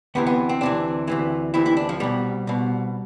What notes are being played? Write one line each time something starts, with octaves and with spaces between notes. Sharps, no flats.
D2 C3 E3 B3
B3
C4
D2 C3 E3 D4
D2 C3 E3
D2 C3 E3 E4
E4
D4
F3
C2 B2 G3
C2 B2